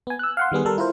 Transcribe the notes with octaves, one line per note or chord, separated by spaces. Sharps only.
B3 G#5
E6 F#6
F5 F#5 C6
D#3 G3 B3 G#4
G3 A4 A#4
E4 F4 A#4 C5